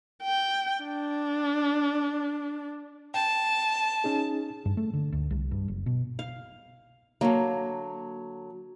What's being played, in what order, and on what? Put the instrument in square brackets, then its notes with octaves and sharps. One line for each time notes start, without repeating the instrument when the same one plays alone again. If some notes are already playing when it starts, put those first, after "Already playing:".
[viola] G5
D4
[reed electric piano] G5 [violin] A5
[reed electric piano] C#4 D#4 G#4
[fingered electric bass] G2
A3
D3
D2
C2
G2
F#1
B2
[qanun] F5
[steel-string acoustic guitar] D3 F#3 [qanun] A#3